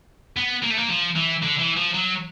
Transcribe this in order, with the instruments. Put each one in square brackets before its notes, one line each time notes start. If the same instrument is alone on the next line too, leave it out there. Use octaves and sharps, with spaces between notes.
[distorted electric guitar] B3
A#3
A3
A#3
F3
E3
D3
E3
F3
F#3